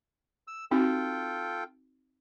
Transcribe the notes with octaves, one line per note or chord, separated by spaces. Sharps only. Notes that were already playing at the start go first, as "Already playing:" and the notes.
E6
C4 D#4 F4 F#4 A4 G5